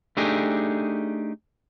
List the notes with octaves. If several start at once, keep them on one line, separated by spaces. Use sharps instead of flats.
A3 D4 D#4 G4 G#4